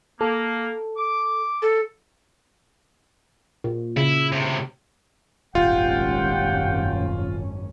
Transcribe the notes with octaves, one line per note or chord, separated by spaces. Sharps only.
A#3 A4
D6
A4
A#2
C#3 E4
A2 C3
D#1 G#1 F#2 C#4 F4 G4 F#5 G5